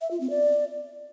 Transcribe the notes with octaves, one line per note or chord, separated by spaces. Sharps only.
E5
F4
C4
D5